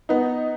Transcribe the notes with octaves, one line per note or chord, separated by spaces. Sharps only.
B3 D#4